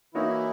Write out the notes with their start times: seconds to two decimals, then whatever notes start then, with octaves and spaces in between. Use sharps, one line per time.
0.14 E3 A#3 D#4 E4 F#4 C#5